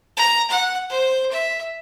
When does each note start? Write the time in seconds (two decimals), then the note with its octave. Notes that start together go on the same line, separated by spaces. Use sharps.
0.17 A#5
0.50 F#5
0.89 C5
1.31 E5